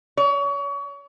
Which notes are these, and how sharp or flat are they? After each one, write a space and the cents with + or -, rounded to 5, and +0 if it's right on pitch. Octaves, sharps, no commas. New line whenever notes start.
C#5 +30